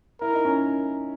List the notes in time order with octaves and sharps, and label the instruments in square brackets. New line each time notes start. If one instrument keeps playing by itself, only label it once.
[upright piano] E4 [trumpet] A#4
[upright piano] D#4
C#4